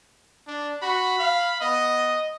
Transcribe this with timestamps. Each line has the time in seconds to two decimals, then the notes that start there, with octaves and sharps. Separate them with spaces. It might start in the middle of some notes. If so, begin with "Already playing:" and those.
0.47 D4
0.83 F#4 B5
1.19 F5
1.61 B3 D#5